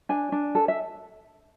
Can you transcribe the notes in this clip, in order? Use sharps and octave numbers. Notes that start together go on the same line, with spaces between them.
D4 G#5
D4
A4
E5